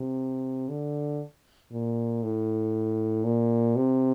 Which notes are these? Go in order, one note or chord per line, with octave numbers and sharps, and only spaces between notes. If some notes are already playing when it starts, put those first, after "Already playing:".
Already playing: C3
D3
A#2
A2
A#2
C3